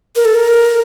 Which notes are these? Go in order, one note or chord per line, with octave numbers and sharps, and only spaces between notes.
A#4
A4
A#4